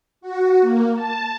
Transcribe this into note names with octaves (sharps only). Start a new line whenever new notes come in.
F#4
A#3
A5